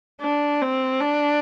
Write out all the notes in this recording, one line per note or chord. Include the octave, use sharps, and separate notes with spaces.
D4
C4
D4